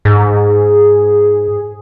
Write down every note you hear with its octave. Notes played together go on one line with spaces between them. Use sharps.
G#2 G#4